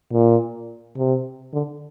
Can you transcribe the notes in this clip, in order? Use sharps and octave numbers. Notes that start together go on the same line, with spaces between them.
A#2
C3
D3